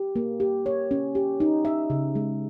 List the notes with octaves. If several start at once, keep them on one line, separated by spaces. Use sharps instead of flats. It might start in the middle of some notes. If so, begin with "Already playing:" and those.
Already playing: G4
A#3
G4
C#5
C#4
G4
D#4
E5
C#3
G#3